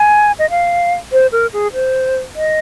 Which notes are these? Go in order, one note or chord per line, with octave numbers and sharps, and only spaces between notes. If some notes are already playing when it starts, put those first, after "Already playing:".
Already playing: G#5
D#5
F5
C5
A#4
G#4
C5
D#5